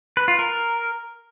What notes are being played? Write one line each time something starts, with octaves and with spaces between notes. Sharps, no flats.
B4
F4
A#4